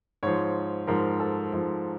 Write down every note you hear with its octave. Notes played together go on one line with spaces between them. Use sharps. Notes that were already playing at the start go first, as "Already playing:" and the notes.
G#2 F3 C#5
G#2 F3 A#4
A4
G#2 F3